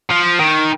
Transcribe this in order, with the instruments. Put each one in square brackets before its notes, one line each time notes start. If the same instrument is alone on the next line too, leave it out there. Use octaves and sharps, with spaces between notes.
[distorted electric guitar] F3
D#3